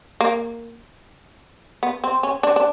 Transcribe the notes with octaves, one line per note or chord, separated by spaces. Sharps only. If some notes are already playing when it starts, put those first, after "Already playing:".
A#3
B3
C4
C#4
D4
D4